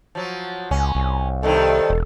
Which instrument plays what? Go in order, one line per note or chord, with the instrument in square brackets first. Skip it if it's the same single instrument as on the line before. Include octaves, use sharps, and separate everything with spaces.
[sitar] F3 F#3
[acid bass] C#2 [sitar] C#4
[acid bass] C2
[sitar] G2 C3 D#3 [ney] A4
[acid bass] E1